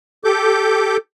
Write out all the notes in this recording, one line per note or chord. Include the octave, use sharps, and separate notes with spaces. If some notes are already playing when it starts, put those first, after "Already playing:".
G4 A4 D6 G6